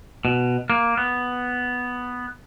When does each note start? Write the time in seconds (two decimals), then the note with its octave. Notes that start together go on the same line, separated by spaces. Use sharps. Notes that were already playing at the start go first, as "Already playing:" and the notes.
0.25 B2
0.70 A#3
0.97 B3